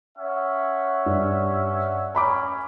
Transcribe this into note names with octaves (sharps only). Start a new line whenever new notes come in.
C#4 E5 F#5
G2
C#4 A#5 B5 D6